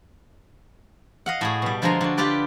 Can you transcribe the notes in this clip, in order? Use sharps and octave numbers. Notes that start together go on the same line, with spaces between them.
D#5 F5 F#5
A2 F#4 G#4
B2 G3
D3 F3 G#3 F4 G#5 A#5
D3 F#4
F4 G4 B4 D5 G5